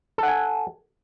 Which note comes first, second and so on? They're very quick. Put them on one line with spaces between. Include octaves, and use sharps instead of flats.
A4 F#5 G#5